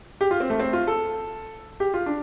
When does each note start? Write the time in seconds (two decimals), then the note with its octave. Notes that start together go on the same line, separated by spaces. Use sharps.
0.21 G4
0.31 F4
0.40 C4
0.50 A3
0.60 C4
0.73 F4
0.87 A4
1.80 G4
1.94 F4
2.06 D4